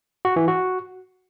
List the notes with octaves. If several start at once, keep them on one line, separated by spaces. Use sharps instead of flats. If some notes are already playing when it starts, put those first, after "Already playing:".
F#4
E3
F#4